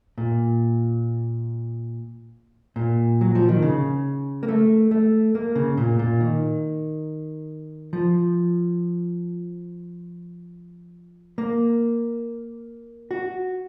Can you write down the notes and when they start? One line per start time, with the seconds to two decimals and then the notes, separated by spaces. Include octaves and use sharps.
0.18 A#2
2.76 A#2
3.21 F#3
3.35 F3
3.49 D#3
3.62 C#3
4.43 A#3
4.48 A3
4.91 A3
5.35 A#3
5.55 C#3
5.77 A#2
5.99 A#2
6.20 D#3
7.93 F3
11.38 A#3
13.11 F#4